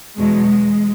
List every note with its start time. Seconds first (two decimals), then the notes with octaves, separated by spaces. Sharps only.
0.18 E2 B2 F#3 G#3
0.47 G#3